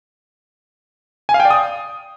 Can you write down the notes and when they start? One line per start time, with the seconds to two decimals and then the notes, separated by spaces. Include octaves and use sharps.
1.29 G#5
1.34 F5
1.40 G5
1.45 D5
1.51 D#6